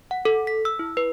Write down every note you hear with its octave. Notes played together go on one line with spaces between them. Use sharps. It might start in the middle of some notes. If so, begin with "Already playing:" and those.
F#5
A4
B6
E6
E4
B4